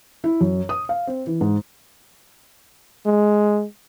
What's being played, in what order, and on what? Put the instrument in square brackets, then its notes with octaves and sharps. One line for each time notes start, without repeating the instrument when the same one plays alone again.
[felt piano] E4
F#2
D#6
F5
C4
E3
G#2
[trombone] G#3